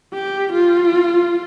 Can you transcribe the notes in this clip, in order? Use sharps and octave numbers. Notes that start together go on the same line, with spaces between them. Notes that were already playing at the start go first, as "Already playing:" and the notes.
G4
F4